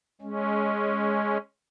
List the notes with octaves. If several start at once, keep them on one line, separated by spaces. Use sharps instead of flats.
G#3 C#4